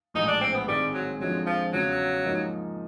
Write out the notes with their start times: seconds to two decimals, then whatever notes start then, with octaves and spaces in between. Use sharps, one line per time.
0.14 A#1 A2 E3 G#3 D#4
0.27 D4
0.41 C4
0.54 B3
0.67 G#2 D#3 G3 G#3 C4
0.94 F#3
1.20 F2 D3 F3 F#3 G#3
1.46 F3
1.73 E2 C#3 E3 F#3
2.25 G#2 F3 A#3 D#4